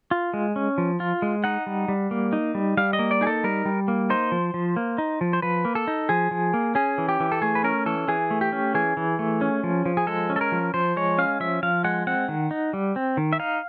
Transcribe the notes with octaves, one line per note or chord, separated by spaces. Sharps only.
F4
G#3
C#4
F3
F4
G#3
D#4 F#5
G3
G3
A#3
D#4
G3
G3 F5
D#5
A#3
D5
D#4 G#4
A4
G3 A#4
G3
A#3
D#4 C5
F3
F3
A#3
D#4
F3
C5
F3 B4
A#3
A4
D#4
F3 G#4
F3
A#3
C#4 G#4
E3
G4
E3
A4
A3 G#4
B4
C#4 A#4
E3 A4
E3 G#4
A3
G4
C#4
E3 G#4
E3
A3
C#4
F3
F3
G#4
G#3 A4
C#4
A4
A#4
F3
F3 C5
G#3 C#5
C#4 F5
F3 E5
F3 F5
G#3 F#5
C4 F#5
D#3
D#4
G3
C4
D#3
E5
D#4 F5